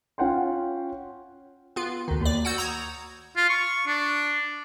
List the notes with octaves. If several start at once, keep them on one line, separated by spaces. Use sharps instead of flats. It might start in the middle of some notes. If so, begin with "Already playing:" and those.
C#4 F4 F#5 G5 C6
B3 F4
D2 D#3
D#2 D5
F#4 F#5 E6 G6
A#5 D#6 G#6
F4
C#6
D4